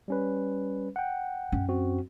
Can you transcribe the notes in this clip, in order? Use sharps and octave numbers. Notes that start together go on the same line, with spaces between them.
G3 C#4 B4
F#5 G5
F#2 C#4
C4 F#4